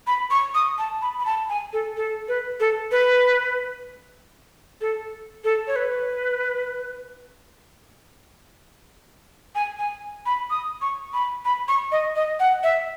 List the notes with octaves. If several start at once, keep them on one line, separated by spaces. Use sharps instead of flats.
B5
C#6
D#6
A5
B5
B5
A5
G#5
A4
A4
B4
A4
B4
A4
A4
C#5
B4
G#5
G#5
B5
D#6
C#6
B5
B5
C#6
D#5
D#5
F#5
E5